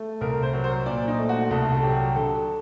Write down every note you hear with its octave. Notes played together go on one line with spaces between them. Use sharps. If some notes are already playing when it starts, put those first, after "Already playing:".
Already playing: A3
C2 A#4
C5
F#3
C5
A#2 D5
D#4
A3
F#4
C2 A4
A4
F#3 G4
D3 A4